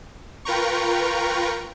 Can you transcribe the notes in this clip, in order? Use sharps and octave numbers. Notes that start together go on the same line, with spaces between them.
F4 A#4 B4 G5 A#5 C#6